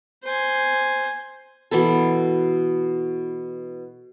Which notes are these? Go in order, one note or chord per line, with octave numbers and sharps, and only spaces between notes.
C5 G#5
B2 E3 E4 A4